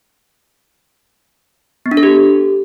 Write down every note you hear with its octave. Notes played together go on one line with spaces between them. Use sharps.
B3
D4
A4
G4